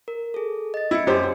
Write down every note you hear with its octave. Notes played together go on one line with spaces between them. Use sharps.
A#4
G#4 A4
D#5 A6
C#4 E4 C#7
F#2 G4 C5